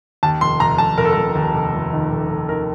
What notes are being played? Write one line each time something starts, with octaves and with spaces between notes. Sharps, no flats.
D#2 A5
F1 C6
F1 A#5
F1 A5
F1 A#4
A4
F1 A#4
D#2
F1
F1
D#3
F1
F1
D#3 A#4